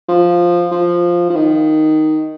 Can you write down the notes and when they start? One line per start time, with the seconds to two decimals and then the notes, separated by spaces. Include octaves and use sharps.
0.09 F3
0.71 F3
1.30 F3
1.36 D#3